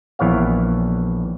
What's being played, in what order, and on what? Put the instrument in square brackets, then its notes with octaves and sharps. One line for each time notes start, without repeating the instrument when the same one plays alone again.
[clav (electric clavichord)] A#1 E3 B3 C#5 F5